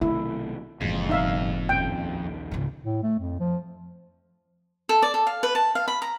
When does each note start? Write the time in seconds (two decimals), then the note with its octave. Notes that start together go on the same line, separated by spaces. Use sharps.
0.01 B1 C3 D#3 A3 D4 E4
0.81 F#1 F2 A2 E3 F3 G#3
1.09 G2 B2 F3 D#4 E5 F5
1.69 A#1 D#2 C#4 G5
2.51 C#2 G#2
2.84 A2
3.03 A3
3.19 F2
3.40 F3
4.89 A4
5.03 D5
5.14 A4
5.27 F5
5.43 B4
5.55 A5
5.75 F5
5.88 B5
6.02 A#5